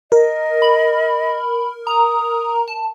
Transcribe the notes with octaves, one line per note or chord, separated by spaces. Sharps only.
A#4 D#5
B5
A#5 D#6
A5